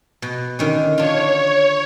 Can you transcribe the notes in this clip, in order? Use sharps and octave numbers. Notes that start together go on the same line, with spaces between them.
B2
D3 D#3 C#4
D4 F4 C#5